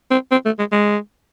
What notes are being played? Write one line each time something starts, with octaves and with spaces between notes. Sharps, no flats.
C4
C4
A3
G#3
G#3